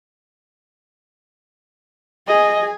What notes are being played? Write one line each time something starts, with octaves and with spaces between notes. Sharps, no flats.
G#4 D#5 G#5